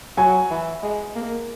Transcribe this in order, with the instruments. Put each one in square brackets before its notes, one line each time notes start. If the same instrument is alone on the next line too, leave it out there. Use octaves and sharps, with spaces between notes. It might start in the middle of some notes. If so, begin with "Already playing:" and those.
[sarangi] F#3 [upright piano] G#5
[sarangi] E3
G#3
A#3